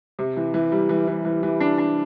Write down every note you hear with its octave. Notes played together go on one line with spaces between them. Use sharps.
C3
E3
E3
G3
E3
E3
E3
E3
D4
D4